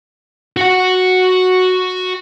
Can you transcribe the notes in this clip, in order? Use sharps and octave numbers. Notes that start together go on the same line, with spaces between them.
F#4 F#5